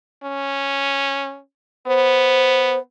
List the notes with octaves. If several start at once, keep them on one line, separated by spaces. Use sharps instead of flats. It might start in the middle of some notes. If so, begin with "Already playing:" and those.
C#4
B3 C5